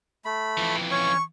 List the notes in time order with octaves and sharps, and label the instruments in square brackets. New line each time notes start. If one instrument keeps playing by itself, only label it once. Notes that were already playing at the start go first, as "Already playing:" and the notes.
[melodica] A3 B5
[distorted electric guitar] F2 E3
[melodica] C#4 C#5 [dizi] C#6